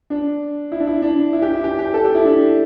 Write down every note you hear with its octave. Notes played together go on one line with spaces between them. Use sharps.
D4
E4
D4
E4
D4
E4
G4
E4
G4
G4
A4
G4
E4
D4